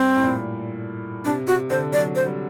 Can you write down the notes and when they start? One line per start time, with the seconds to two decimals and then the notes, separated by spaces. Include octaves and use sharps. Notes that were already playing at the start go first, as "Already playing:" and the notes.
Already playing: G2 C4
0.16 A2
0.23 A#2
1.25 C3 D4
1.47 C3 F#4
1.70 D3 C5
1.92 F#3 D5
2.15 C5
2.26 G3